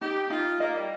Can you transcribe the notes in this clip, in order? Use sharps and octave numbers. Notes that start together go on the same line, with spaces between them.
D#4 G4
D#4 F4
A#3 D#5
G3